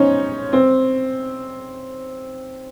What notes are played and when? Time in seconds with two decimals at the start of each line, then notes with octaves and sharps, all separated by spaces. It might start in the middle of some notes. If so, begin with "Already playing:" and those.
Already playing: C#4 D#4 C5
0.53 C4